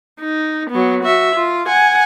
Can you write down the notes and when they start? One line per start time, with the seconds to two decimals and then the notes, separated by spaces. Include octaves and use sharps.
0.20 D#4
0.70 F#3 B3
1.04 F#4 E5
1.36 F4
1.68 F#5 G#5